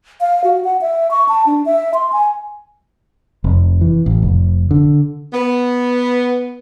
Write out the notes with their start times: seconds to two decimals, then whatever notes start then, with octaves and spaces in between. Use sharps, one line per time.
0.21 F5
0.44 F#4
0.64 F#5
0.81 E5
1.11 C#6
1.29 A5
1.46 D4
1.66 E5
1.94 C6
2.12 G#5
3.44 F1
3.81 E3
4.06 A1
4.22 F1
4.71 D3
5.33 B3